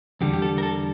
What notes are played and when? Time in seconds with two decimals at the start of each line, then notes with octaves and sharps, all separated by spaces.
0.21 E2 D3 G3 G4
0.33 G4
0.42 A4
0.58 A#4
0.63 A4